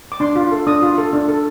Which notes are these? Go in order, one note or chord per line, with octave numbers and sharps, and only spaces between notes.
D6
D4 C6
F4
A4
D4 D#6
F4
A4
D4
A4